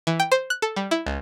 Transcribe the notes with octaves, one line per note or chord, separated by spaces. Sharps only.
E3
G5
C5
F#6
A4
G3
E4
C#2